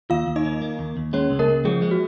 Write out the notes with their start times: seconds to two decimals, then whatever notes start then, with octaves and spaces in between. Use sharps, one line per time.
0.10 D#2 F4 F5
0.27 D#2
0.36 D#4 D#5
0.45 D#3
0.62 A#3
0.79 D#2
0.97 D#2
1.13 G#3 C#4 C#5
1.31 C#2
1.39 A#3 A#4
1.48 C#3
1.65 F3 G#3 G#4
1.82 G#3
1.91 F#4